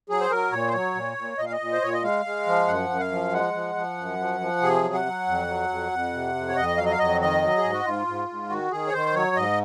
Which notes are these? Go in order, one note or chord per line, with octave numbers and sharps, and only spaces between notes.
F#3 G#4
C5
F#3 A#4
A#2 C#5
C5
F#3 C#5
A#2
A#2
A#2 D#5
F5
D#5
A#2
C5
A#2 C#5
D#5
G#3 F5
G#3
F3
F#2 F#5
F#2
F5
F3
G#3 F#5
F3
F3
F#2
F3
F3
C3 G#4
F#3
F#5
F#3
F2
F#3
F2
F2
C3
F2
C#5
F2 D#5
F#3 F5
D#5
F5
F2 D#5
D#3 D#5
F#3
G#4
G#2
F#4
G#2 F4
G#2
G#2
D#3 F#4
D#3 G#4
C#5
D#3 C5
F#3 C#5
G#2 D#5